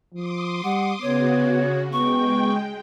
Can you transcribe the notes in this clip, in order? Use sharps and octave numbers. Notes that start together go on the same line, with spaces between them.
F3 C6 D6 D#6
G3 F#5
C#3 B3 F#4 C#5
G#3 B3 G5 C#6